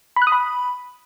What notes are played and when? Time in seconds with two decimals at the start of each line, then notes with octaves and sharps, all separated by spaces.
0.16 B5
0.22 F#6
0.27 D#6
0.32 B5